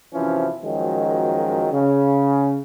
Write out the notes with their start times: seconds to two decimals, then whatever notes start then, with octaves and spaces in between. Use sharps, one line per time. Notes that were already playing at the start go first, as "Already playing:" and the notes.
0.14 F#2 C3 E3 F3 C#4 E4
0.63 F#2 D#3 F3 F#3 G#3
1.72 C#3